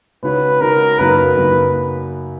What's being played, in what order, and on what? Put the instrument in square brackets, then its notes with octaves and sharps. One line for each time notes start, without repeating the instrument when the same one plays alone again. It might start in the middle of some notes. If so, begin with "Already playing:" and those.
[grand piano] C#3 G#3 D#4 F#4 C#5 [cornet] B4
[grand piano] C#3 G#3 D#4 F#4 C#5 [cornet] A#4
[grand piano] F#2 C#3 F#3 A#3 D#4 [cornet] B4
[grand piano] F#2 C#3 F#3 A#3 D#4